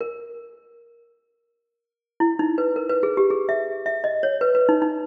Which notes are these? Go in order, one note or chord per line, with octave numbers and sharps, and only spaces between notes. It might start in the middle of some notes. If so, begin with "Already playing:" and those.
A#4
E4
D#4
B4
A#4
B4
G#4
G4
G#4
E5
E5
D#5
C#5
B4
B4
D#4
D#4